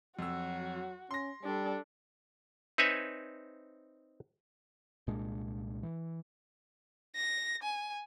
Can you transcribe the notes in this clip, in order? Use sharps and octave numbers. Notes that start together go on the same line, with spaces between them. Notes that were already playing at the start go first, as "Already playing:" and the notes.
F2 F#3 F#4 E6
C#4 C6 A#6
G3 D4 A4
C4 D#4 B4 C#5 E5 G#5
C2 A#2 G#3 D4
E3
A#6
G#5